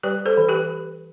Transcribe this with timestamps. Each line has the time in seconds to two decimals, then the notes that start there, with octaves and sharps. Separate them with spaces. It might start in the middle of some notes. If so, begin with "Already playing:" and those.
0.03 G3 G4 B4
0.26 A4 C5
0.37 E3
0.49 G4 B4